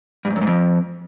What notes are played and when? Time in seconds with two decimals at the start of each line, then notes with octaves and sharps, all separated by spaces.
0.25 G2
0.30 G#2
0.36 F#2
0.41 G#2
0.47 F2